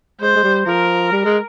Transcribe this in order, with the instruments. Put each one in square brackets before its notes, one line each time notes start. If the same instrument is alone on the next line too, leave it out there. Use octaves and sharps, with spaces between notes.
[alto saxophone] G#3 [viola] C5
[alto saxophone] G#3
G3
[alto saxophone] F3 [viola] A#4
[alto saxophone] G3
G#3